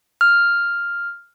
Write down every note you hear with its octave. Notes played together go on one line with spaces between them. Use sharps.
F6